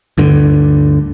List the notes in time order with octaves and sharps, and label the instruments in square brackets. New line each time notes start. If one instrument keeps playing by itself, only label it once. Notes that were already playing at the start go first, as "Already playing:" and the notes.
[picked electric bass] D2 G2 D3